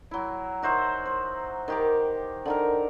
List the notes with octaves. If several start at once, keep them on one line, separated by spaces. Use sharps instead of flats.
F#3 E4
D#4 F#4 C5 E5
C5
D#3 G4 D6
D3 D#3 A#4